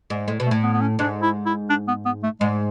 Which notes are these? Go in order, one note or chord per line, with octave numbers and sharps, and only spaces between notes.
G#2
A2 G#3
B2
A3
A2
B3
B3
C#4
G#2 D4
E4
E4
D4
B3
B3
A3
G#2 G#3